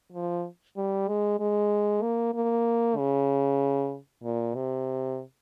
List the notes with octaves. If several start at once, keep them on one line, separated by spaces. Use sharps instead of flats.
F3
G3
G#3
G#3
A#3
A#3
C#3
A#2
C3